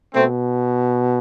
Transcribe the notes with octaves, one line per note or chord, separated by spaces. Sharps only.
B2 A3 C4